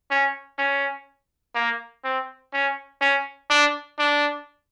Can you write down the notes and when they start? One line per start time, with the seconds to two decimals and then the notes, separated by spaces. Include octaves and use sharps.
0.11 C#4
0.59 C#4
1.55 A#3
2.04 C4
2.53 C#4
3.01 C#4
3.50 D4
3.99 D4